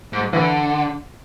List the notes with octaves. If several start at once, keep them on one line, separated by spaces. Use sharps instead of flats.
G#2
D3 E3